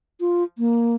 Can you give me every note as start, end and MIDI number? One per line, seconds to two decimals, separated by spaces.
0.20 0.44 65
0.58 0.96 58